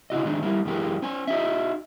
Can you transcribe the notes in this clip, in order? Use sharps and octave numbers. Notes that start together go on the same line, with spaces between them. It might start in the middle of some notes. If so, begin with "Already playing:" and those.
C#3 E4 F#4 D#5
D#3 G#3 C4 D4 D#4
G3 A#3 E4
F#2 E3 G#3 G4 A#4
C#4 C5 G#5
D#4 F#4 D#5 E5